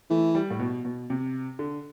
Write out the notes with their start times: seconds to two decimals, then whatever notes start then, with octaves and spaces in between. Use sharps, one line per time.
0.10 E3 A3
0.35 G3
0.50 A2
0.59 B2
0.85 B2
1.10 C3
1.59 D3